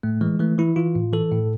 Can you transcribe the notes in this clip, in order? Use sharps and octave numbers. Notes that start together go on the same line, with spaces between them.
A2 A3
E3 G#3
E3 A3
E3 E4
E3 F4
A2
E3 A4
A2